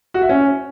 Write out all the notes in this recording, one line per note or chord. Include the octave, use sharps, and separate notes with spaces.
F#4
E5
C#4